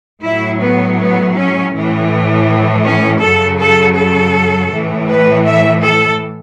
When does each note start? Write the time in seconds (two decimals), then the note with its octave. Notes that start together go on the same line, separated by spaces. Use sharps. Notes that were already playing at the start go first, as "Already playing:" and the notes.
0.23 A2 F#3 E4
0.61 B3
0.99 B3
1.36 C#4
1.73 A2 E3
2.84 C#4
3.21 F#2 C#3 F#3 A4
3.59 A4
3.95 A4
4.70 A2 E3
5.08 B4
5.45 E5
5.82 A4